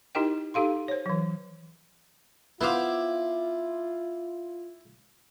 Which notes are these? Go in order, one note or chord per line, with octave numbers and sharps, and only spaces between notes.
D#4 E4 G4 A#4 D#5 G5
D#4 G4 A4 F5 C6
C5 C#5
E3 F#3
B3 E4 F4 C5 F5 D6